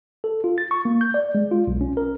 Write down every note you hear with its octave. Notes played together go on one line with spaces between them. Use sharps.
A4
F4
A6
C#6
A#3
G6
D5
G#3
F4
B1
C#4
A#4